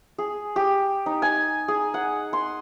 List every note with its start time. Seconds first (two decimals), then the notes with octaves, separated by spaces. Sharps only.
0.18 G#4
0.56 G4
1.06 D#4
1.22 G#5
1.68 G#4
1.94 F#5
2.33 C6